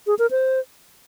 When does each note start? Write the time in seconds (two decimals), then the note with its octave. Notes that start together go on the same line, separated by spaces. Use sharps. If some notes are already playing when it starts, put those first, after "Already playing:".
0.07 G#4
0.19 A#4
0.31 C5